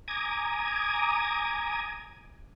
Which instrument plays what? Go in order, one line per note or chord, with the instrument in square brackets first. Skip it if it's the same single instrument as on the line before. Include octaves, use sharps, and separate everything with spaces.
[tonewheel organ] G#5 A#5 D6 D#6 G#6